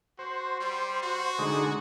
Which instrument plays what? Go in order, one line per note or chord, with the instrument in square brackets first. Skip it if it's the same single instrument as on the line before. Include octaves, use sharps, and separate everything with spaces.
[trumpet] F#4 [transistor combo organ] C5
[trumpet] G3
F#4
[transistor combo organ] D3 G#3 D#4